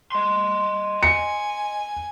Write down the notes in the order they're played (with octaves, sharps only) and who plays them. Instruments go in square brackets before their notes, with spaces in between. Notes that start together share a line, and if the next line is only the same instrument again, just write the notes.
[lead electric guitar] D#5 C6
[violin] G#5 [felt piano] C#7